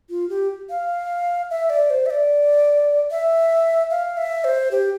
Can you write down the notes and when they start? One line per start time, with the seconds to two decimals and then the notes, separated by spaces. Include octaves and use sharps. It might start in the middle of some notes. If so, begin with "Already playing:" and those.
0.10 F4
0.30 G4
0.70 F5
1.50 E5
1.70 D5
1.90 C5
2.06 E5
2.10 D5
3.11 E5
3.91 F5
4.17 E5
4.44 C5
4.71 G4